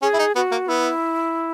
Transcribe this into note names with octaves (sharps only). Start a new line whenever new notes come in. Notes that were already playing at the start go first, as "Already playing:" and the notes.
C#4 G#4
E4
D#4
B3 F#4
A#3
B3 E4